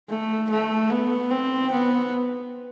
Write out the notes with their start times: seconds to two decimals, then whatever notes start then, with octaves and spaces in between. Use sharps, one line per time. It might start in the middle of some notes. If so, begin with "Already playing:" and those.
0.09 A3
0.50 A3
0.90 B3
1.31 C4
1.71 B3